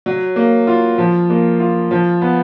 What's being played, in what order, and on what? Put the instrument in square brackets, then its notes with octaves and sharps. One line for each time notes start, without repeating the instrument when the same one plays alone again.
[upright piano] F#3
A#3
F4
F3
A#3
F4
F3
B3